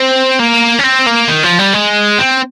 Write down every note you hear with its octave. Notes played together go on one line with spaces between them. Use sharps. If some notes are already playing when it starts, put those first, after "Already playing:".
Already playing: C4
A#3
C#4
C4
A#3
D#3
F3
G3
G#3
C4